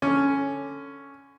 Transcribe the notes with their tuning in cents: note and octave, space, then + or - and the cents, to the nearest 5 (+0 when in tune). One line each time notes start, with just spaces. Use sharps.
D3 +0 C#4 +0